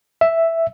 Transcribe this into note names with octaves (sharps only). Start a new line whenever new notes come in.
E5